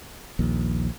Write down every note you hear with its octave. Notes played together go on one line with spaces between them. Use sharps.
A#1 D#2